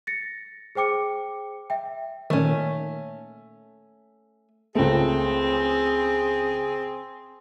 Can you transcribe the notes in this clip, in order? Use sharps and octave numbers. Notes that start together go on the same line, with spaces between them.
A6 A#6 C#7
G#4 C5 G5 D6 C#7
E5 G5
A#2 D#3 A3 C#4
C#2 A3 C4 G#4